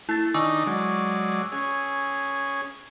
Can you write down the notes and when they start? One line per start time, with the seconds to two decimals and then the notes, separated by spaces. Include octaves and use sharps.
0.09 A3 E4 A6
0.34 D#3 D4 D#4 G#5 C#6 E6
0.67 F#3 G#3 D5
1.52 C#4 G#4